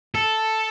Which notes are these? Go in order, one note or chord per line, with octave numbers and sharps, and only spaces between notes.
A4